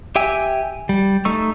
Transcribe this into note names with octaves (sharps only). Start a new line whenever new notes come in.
G4 E5 G5 G#5 E6
G3
A3 D#4 C#6 E6